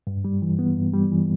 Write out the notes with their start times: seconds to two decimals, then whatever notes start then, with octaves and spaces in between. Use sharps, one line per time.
0.07 G2
0.25 G3
0.42 E3
0.59 B3
0.77 G2
0.94 G3
1.12 E3